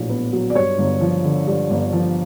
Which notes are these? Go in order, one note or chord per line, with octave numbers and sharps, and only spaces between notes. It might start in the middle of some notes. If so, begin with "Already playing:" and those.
Already playing: A#1 A2 F#3
B3
F#3
D5
G2 C#5
G1
F3
D3
G2
G1
F3